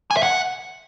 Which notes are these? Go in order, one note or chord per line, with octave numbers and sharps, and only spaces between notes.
G#5
E5
F#5